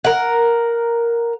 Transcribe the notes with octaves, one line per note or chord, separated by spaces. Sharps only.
A#4 F#5